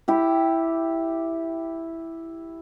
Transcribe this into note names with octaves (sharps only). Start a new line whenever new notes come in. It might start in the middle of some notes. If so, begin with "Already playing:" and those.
E4 G4